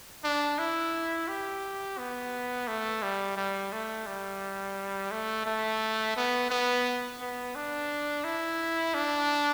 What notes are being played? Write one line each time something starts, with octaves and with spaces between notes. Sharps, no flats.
D4
E4
G4
B3
A3
G3
G3
A3
G3
A3
A3
B3
B3
B3
D4
E4
D4